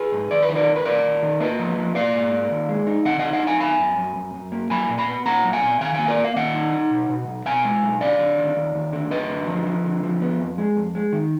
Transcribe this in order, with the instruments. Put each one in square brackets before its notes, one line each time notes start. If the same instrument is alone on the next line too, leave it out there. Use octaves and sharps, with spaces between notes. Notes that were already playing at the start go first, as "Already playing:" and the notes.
Already playing: [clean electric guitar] G#4 B4
G#2
D#2 D5
B4
D#3
A#4 D5
D#2
B4
D#2 A#4 D5
D#2
D#3
A#3 B4 D#5
F3
F3
A#3 D5 F5
G#2
A#3
D#2
G#3
D#4
D3 D#5 F#5
D#5 F#5
D#4
D#5 F#5
D#4 F5 G#5
F#2 G#5 B5
F#2
F#2
F#2
F#2
A#3
F#3 G#5 B5
A#2
G#5 B5
B3
A#2 F#5 A#5
F#3
F5 G#5
A#2
D#3 F5 G#5
A#3 F5 G#5
A#4 D5
A#3
F5
D#3 D#5 F#5
D#4
D#4
B2
B2
B1
B2 F5 G#5
G#3
B1
D3 D5 F5
D3
D#2
D#2
D#2
D3
F#2 B4 D#5
D3
F3
F3
D3
F3
B3
F2
G#3
F2
G#3
D#3